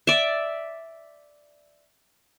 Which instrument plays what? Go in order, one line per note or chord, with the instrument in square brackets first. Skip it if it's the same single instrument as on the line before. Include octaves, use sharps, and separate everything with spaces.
[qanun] D5 E5